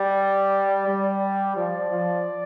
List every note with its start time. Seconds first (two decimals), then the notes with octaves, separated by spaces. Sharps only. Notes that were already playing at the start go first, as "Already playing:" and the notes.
Already playing: G3 D5
0.86 G3
1.55 F3 D5
1.90 F3